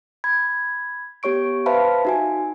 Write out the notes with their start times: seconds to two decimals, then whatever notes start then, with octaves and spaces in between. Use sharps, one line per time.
0.24 B5 G#6
1.23 B3 G4 C#5 C#6 D7
1.66 B4 C5 E5 F5 A5 B5
2.05 D#4 F#4 G#5